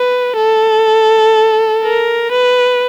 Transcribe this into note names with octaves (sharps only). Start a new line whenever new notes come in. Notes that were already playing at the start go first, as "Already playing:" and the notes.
Already playing: B4
A4
A#4
B4